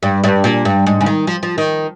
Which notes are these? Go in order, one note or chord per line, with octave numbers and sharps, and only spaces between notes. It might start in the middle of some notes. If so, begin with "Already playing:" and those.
G2
G2
A#2
G2
G#2
C#3
D#3
F3
F3
D#3